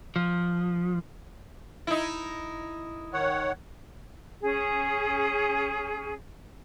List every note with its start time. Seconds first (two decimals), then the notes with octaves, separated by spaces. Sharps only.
0.16 F3
1.87 D#4 E4
3.13 D#3 C#5 F#5
4.41 C#4 G#4